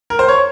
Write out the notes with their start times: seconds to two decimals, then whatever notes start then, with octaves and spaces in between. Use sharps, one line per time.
0.10 A#4
0.19 C5
0.28 C#5